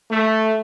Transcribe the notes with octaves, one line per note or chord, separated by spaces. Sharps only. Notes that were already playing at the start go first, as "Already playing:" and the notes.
A3